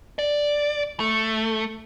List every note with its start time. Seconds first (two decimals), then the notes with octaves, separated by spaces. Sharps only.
0.19 D5
1.00 A3